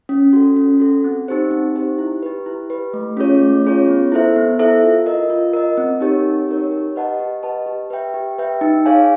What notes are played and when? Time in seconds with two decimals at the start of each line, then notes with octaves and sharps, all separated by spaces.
0.09 C#4
0.33 F#4 A4
0.56 C#4
0.80 F#4 A4
1.04 C4
1.28 D#4 G4 C5
1.51 C4
1.75 D#4 G4 C5
1.98 E4
2.23 G4 B4
2.46 E4
2.70 G4 B4
2.93 A3
3.17 C#4 F4 G#4 C#5
3.41 A3
3.65 C#4 F4 G#4 C#5
3.88 B3
4.12 E4 A4 C5 E5
4.36 B3
4.59 E4 A4 C5 E5
4.83 F4
5.06 A#4 D#5
5.30 F4
5.53 A#4 D#5
5.77 C4
6.01 D#4 G4 A#4 C#5
6.25 C4
6.48 D#4 G4 A#4 C#5
6.72 G4
6.96 B4 D#5 F#5 A5
7.20 G4
7.43 B4 D#5 F#5 A5
7.66 G4
7.90 B4 E5 G5
8.14 G4
8.38 B4 E5 G5
8.61 D#4
8.86 G#4 C#5 F5 G#5